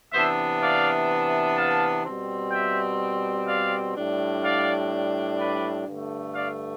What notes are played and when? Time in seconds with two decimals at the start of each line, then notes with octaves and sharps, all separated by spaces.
0.13 C3 E3 B3 D4 C5 E5
0.61 D5 F5
1.57 F5 A5
2.05 B2 G3 C4
2.52 E5 G5
3.48 D5 F5
3.95 A2 G3 D4
4.44 D5 F5
5.39 B4 D5
5.87 G2 D3 A3
6.34 D5 F5